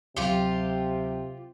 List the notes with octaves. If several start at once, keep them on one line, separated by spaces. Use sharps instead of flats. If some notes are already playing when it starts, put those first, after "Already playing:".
D2 C3 F#3 F4 G4